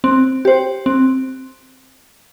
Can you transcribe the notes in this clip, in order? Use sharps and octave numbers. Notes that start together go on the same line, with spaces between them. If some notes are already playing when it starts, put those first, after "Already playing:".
C4
G4 C5
C4